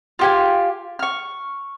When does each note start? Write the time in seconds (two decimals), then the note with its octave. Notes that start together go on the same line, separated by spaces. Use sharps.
0.19 F4 G4 G#5
0.99 C#6 F6